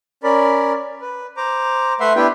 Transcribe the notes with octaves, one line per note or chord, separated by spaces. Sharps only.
C#4 A#4 D5 B5
B4
C5 A#5 D6
A3 B4 E5 F#5 B5 C6
B3 D4 E4 G4 B4 G5